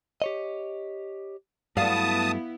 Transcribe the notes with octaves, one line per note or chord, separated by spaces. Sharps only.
G4 C#5 D#5
G2 F#3 A3 B3 E4 F5 A5 D#6